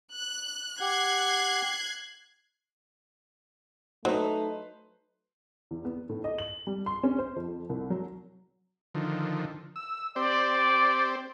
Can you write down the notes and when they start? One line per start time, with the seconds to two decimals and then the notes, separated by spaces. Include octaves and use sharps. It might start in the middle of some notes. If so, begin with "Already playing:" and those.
0.13 F#6
0.80 G4 F#5 F#6 G#6 C7
4.05 F#3 A3 D#4 B4 C5
5.71 E2
5.85 B3
6.09 A2
6.24 D#5
6.38 F#7
6.67 G3
6.86 C6
7.03 C#4
7.18 C5
7.36 F2
7.69 C2
7.90 F#3
8.95 D3 D#3 F3
9.76 E6
10.16 C4 G4 C5 D5